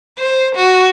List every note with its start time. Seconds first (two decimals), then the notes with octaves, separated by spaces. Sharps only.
0.18 C5
0.55 F#4